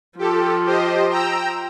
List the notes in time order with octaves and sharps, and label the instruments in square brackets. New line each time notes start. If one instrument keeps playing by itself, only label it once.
[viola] F3 [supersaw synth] G4 A4
[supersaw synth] G4 C5 D#5
G5 A#5 E6